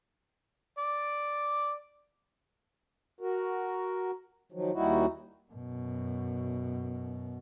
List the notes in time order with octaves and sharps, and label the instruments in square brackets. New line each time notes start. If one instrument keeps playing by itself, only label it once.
[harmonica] D5
[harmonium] F#4 A#4
D#3 F3 F#3
D#2 G3 D#4 E4 F#4
[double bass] F#2 B2